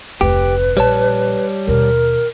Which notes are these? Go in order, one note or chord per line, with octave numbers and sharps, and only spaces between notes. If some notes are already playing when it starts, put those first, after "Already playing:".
F1 D2 G4 B4
A#1 G3 C#5 A5
D#2 B2 A#4